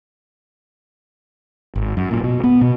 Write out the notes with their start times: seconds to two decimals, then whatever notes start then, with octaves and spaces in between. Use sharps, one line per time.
1.75 G#1
1.97 F#2
2.11 A#2
2.23 B2
2.44 B3
2.61 B2